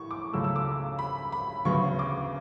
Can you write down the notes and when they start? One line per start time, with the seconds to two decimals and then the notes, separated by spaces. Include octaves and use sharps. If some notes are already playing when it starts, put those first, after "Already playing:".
Already playing: A2 C#6
0.11 D6
0.32 C#2 C#3 F#3 A3 E6
0.44 E6
0.56 D6
0.99 B5
1.32 B5
1.65 D2 C#3 F#3 B3 C#6
1.99 D6